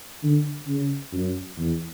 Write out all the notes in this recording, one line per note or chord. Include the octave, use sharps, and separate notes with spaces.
D3
C#3
F#2
E2